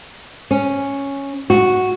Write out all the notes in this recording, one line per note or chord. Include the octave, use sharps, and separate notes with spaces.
C#4
F#4